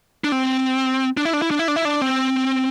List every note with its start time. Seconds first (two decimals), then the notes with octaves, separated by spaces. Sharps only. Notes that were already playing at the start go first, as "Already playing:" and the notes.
0.24 D4
0.32 C4
1.17 D4
1.25 E4
1.33 D4
1.42 E4
1.51 D4
1.59 E4
1.68 D4
1.76 E4
1.85 D4
2.02 C4